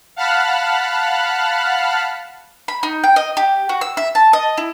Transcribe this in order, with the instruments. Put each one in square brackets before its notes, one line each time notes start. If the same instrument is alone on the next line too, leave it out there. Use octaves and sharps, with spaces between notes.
[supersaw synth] F5 F#5 A5 B5 F6 F#6
[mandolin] B5
D#4
G5
D#5
G4
F#4
E6
E5
A5
D#5
E4